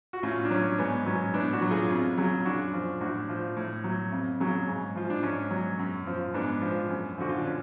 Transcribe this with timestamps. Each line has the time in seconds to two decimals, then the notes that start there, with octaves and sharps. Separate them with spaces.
0.13 F#4
0.23 A2 C#4 F4
0.45 D4
0.51 F#3 C#4
0.78 G#2 B3
1.06 F#3 C#4
1.34 A2 B3 D4
1.53 D4 F#4
1.62 F#3
1.71 F4 G#4
1.90 F2
2.18 C#3 F#3
2.45 F#2 D4 F#4
2.74 F3
3.00 A2 D4 F#4
3.29 F3
3.57 A2
3.84 F#3
4.12 F2
4.40 C#3 F#3
4.67 G#2
4.96 F3 F4
5.10 D4
5.23 G#2 C#4
5.51 F#3
5.79 F#2
6.07 F3
6.34 G#2 B3 D4
6.62 F3
6.89 F#2
7.18 D3 F3 F#4
7.29 F4
7.38 D4
7.46 C#4